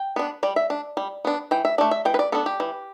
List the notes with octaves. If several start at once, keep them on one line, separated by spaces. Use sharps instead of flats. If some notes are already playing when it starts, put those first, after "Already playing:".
Already playing: G5
B3 D4
G3 D5
E5
D4
G3
B3 D4
E3 G5
E5
A3 D4 D5
E5
E3 G5
B4
D5
B3 D4 A4
G4
E3